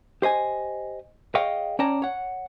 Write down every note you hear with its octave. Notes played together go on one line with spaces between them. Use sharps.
G4 C5 D#5 G#5
G#4 C#5 D#5 F5 G5
C#4 C#5 D5 G5 A5 A#5
C#5 F#5